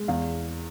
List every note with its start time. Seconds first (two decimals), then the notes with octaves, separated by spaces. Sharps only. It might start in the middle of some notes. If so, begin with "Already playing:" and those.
Already playing: G#3
0.08 E2 F5